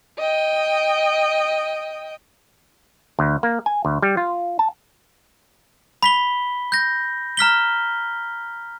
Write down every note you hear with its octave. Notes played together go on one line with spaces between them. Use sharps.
D#5 G5
D2
A#3
G#5
D2
G3
F4
A5
B5 B6 G7
G6 A#6
A#5 F6 B6 G7